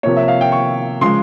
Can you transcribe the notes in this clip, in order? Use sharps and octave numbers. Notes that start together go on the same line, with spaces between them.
C3 F3 A#3 C#5
E5
F5
G5
C#6
C#3 F3 G#3 C6